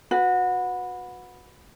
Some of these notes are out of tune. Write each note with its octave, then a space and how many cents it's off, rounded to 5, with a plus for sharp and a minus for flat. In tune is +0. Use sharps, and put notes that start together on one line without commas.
F#4 -25 B4 +0